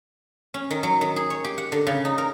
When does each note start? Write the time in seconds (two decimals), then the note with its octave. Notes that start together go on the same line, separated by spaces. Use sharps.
0.54 C#4
0.71 D#3
0.83 F#3
1.01 D#3
1.16 G#4
1.30 C#5
1.44 G4
1.58 F#5
1.72 D3
1.87 C#3
2.05 D#4
2.18 A#4